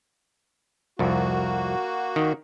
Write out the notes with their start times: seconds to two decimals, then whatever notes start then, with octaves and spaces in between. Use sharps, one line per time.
0.99 C2 F2 A#3 F#4
2.16 D#3